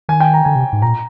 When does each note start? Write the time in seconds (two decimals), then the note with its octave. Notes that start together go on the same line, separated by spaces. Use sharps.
0.09 D#3 G#5
0.20 G5
0.34 A#5
0.45 D3 G#5
0.55 C3
0.73 G#2
0.82 A#2 A#5